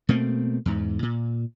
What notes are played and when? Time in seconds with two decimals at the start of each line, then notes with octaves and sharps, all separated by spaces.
0.09 B2 A3 A#3 C4
0.65 E2 G#2
1.03 A#2